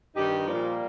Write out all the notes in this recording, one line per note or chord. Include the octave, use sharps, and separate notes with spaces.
G2 D#3 D#4 G4
A#2 F3 G3 A#3